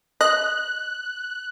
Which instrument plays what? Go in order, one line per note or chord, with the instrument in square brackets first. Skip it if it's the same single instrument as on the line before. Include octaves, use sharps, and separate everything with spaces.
[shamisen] D#5 [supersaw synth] F#6